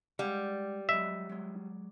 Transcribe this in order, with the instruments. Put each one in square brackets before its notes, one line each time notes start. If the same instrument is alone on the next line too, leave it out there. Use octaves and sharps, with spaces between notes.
[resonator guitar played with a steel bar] G3 [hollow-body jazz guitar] G#3 F5 F#5
[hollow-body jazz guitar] F#3 G#3 D#5 [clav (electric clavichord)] E5
[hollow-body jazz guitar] F#3 G#3